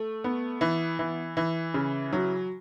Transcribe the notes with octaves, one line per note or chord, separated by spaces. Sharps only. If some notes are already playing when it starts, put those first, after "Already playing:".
Already playing: A3
B3
E3
E3
E3
C#3
F#3